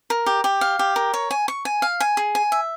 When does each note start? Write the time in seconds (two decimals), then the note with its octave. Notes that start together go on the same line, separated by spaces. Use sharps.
0.10 A#4
0.26 G4
0.44 G4
0.61 F5
0.79 G4
0.96 A#4
1.14 C#5
1.31 G#5
1.48 C#6
1.65 G#5
1.82 F5
2.00 G#5
2.17 G#4
2.35 G#5
2.52 E5